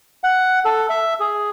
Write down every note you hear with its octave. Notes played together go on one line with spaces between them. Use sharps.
F#5
A4
E5
G#4